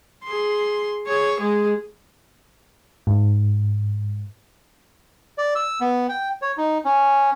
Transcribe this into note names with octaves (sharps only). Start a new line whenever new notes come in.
G#4 C6
G#4 C#5
G#3 G#4
G#2
D5
E6
B3
G5
C#5
D#4
C#4